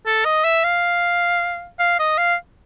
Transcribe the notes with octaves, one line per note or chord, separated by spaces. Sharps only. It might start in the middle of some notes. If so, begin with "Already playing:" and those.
A4
D#5
E5
F5
F5
D#5
F5